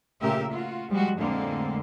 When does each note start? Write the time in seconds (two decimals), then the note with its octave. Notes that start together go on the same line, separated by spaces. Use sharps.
0.20 A#2 C#3 A3 G4 A#4 E5
0.51 F4 F#4
0.89 F3 G3 G#3 F#4
1.18 F2 A2 D3 G#3 A#3 C4